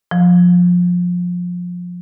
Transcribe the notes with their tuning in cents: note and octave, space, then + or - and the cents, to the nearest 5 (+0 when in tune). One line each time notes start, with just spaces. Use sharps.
F3 +25